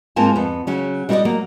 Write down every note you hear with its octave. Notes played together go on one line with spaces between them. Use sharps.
G#2 A#3 C4 F4 G#5 A5
F2 B3
C#3 F#3 C#4
G3 E4 F#4 A#4 D5 D#5
F#3 A#3